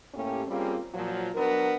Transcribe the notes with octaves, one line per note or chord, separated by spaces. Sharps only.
A2 A3 A#3 C#4 G4
G3 A#3 C4 C#4 F4 G#4
A#2 F3 F#3
F#3 B3 D4 A#4